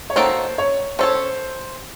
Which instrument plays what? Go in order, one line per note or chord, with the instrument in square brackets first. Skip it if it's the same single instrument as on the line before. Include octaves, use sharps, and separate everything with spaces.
[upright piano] C#5
[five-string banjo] D#3 A#3 D#4 F#4 A4 [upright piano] C5
[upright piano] C#5
[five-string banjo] C#4 A4 C#5 [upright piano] C5